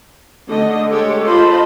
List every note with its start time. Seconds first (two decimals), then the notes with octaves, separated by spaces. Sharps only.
0.48 D3 A3 D#5
0.91 G#3 G4 A4 C#5
1.25 F4 C5 D#5 A5 B5